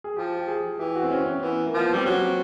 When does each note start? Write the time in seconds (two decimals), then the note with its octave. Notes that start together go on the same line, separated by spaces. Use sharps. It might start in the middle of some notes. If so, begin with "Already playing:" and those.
0.04 G#4
0.16 F3 G4
0.37 G4
0.48 G#4
0.79 E3 G4
0.95 F#4
1.03 C4
1.11 C#4
1.26 C#4
1.42 E3 B3
1.66 A#3
1.74 F3 B3
1.94 G3 C4
2.05 F#3 C#4
2.15 C#4
2.21 C4